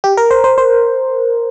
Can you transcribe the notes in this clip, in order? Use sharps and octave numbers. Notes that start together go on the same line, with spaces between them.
G4
A#4
C5
C5
C5